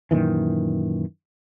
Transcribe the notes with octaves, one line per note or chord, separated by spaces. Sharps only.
F#2 A#2 D#3 E3